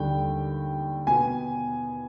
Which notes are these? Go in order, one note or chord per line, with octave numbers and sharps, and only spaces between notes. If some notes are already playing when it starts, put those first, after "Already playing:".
Already playing: D#2 D3 G3 G5
B2 B3 G#5